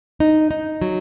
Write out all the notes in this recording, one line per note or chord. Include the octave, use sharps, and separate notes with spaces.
D#4
D#4
F#3